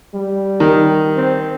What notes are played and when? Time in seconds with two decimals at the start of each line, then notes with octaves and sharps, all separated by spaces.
0.14 G3
0.60 D#3
1.17 C4